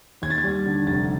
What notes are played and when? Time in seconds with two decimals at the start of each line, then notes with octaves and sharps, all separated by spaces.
0.22 D#2 G#6
0.30 A6
0.38 G#6
0.44 G3
0.66 D3
0.87 F1 A6